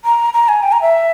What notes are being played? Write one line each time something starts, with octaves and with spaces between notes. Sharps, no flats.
A#5
A#5
G#5
G5
A#5
E5